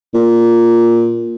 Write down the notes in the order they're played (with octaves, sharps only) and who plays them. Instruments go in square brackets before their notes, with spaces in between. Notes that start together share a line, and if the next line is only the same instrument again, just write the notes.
[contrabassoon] A#2